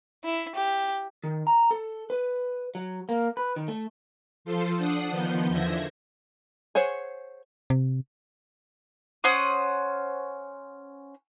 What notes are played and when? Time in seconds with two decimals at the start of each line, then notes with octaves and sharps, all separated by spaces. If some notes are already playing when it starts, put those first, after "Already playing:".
0.24 E4
0.56 G4
1.24 D#3
1.47 A#5
1.71 A4
2.10 B4
2.75 F#3
3.09 A#3
3.37 B4
3.56 D#3
3.68 A3
4.45 F3 F4 A4 C5
4.78 D4 F#5 D#6 C7
5.11 D#3 F3 B3 G6
5.48 E2 D3 F3 E5 G#6 A#6
6.75 G#4 C5 C#5 F#5 G#5
7.70 C3
9.24 C#4 C5 F#5 D#6